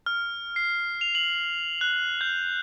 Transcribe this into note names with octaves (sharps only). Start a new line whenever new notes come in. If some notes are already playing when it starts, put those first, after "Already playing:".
F6
C7
F7
F#7
F#6
G6